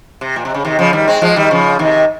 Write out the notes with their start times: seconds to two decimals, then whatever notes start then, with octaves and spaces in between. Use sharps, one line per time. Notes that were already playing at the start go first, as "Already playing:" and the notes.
0.21 C3
0.36 A#2
0.45 C3
0.54 C#3
0.65 C3 D#3
0.79 C#3 F3
0.93 D#3 G3
1.08 G#3 C4
1.21 F3 G#3
1.36 D#3 G3
1.51 C#3 F3
1.79 C3 D#3